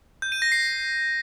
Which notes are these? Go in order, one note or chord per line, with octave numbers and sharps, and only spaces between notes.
G6
D#7
A#6
C7